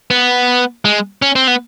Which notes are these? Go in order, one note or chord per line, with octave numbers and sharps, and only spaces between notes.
B3
G#3
C#4
C4
B3